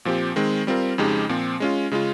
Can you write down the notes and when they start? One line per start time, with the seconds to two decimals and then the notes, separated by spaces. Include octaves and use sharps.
0.05 A#2 F3 C4 G4
0.36 D#3 G#3 C4
0.67 G3 C4 F4 A#4
0.98 F2 C#3 G#3 D#4 G4
1.29 A#2 F3 C4
1.60 G#3 C#4 F4
1.91 C#3 G#3 C#4 F4